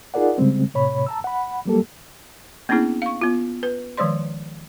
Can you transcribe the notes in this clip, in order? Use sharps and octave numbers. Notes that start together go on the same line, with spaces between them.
D#4 F4 G#4 A#4 D5 F#5
C#3 G3 G#3 C4
A2 C3 C#5 B5
A5 A#5 E6
F#5 B5
F#3 G3 A#3 G4 A4
A#3 B3 C#4 D4 E4 G#4
F5 C#6
B3 F4
B4
D#3 F3 G#3 C5 D5 C6